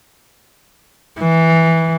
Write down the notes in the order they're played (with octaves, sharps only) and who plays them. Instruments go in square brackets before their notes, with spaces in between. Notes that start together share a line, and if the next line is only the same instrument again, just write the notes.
[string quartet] E3